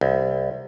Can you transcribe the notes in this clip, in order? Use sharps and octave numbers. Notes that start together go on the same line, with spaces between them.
C2